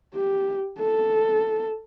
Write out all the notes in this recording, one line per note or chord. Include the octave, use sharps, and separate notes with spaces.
G4
A4